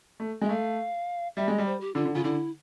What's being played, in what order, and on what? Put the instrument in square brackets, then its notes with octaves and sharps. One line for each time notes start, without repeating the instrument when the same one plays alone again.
[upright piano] A3
G#3
[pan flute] E5
[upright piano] A3 [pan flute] F5
[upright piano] G3 [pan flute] E5
[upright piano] G#3 [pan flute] D#5
[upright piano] G3
[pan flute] C5
G4
[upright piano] D3 [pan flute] F4
[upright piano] D3
[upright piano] C#3 [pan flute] F4
[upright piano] D3 [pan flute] E4